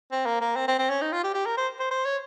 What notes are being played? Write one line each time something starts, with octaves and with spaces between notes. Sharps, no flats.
C4
A#3
A#3
C4
C4
C4
C#4
D#4
F4
G4
G4
A#4
C5
C5
C5
C#5